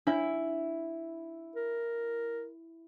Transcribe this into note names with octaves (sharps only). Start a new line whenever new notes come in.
D4 E4 C#5
A#4